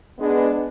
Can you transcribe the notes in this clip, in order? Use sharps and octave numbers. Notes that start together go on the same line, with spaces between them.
G#3 B3 D4